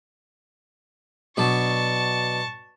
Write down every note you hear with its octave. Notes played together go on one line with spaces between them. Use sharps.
B2 F#3 D4 A5 C#6